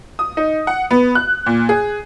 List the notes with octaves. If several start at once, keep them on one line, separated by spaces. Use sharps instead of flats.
D#6
D#4
F#5
B3
F#6
A#2
G#4